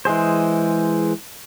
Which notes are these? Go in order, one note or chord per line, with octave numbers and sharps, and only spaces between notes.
E3 G#3 G#4 C5